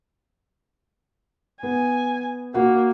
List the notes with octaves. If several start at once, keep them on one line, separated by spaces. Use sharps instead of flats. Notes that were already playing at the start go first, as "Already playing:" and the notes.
B3 G#5
A#3 F#4 F#5